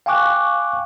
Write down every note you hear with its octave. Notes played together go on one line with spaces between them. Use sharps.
F5 G5 G#5 C#6 D6 F#6